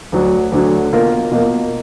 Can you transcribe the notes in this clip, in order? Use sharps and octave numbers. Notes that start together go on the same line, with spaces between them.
D2 D3 F#3
D2 D3 F#3
B2 A#3 F4 A#4
B2 A#3 F4 A#4